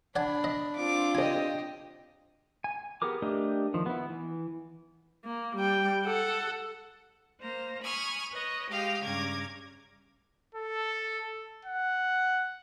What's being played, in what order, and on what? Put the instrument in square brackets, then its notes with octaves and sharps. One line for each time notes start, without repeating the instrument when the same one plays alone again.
[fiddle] D4 B5 [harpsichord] D5 F#5 G#5
[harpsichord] D#5
[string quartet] C4 D4 F4 [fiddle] D6
[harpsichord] C2 G#5 [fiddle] G4 D#5
[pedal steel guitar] G#5
B3 G4 G#4 A#4 D6
A3 D4 G4 A#4 D#5
D#3 F3
B3 E4
E3
[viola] A#3
G3 G5
A4 F#5
[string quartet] A#3 C5 A#5
G#5 B5 C#6 D#6 F6
B4 C#5 D#5
G#3 G4 D#5 F5 G5
G2 C#3 C#4 A#5 D6 G#6
[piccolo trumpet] A4
F#5